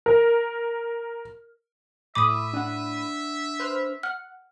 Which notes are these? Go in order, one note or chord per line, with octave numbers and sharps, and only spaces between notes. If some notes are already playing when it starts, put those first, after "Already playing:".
A#4
A2 E5 B5 D6 D#6 D#7
D4 F#5
B4 C5 F6
F#5 F6